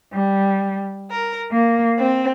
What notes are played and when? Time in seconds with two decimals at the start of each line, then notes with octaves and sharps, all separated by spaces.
0.13 G3
1.11 A#4
1.51 A#3
1.99 C4